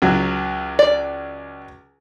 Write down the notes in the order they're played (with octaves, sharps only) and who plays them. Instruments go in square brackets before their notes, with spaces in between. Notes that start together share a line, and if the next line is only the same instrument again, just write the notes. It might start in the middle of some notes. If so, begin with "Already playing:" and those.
[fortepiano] C#2 F#3
[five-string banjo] D5